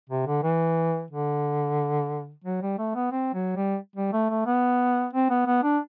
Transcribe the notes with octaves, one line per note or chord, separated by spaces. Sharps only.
C3
D3
E3
D3
F#3
G3
A3
B3
C4
F#3
G3
G3
A3
A3
B3
C4
B3
B3
D4